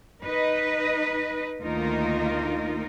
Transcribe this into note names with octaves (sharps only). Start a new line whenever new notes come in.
D#4 B4 D#5
D2 D#3 A#3 D#4 F4 A#4